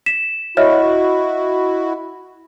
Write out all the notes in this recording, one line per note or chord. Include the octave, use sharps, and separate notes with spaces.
B6 E7
E4 F#4 C#5 D#5 E5 F6